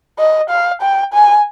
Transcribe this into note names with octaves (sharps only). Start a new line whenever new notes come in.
D#5
F5
G5
G#5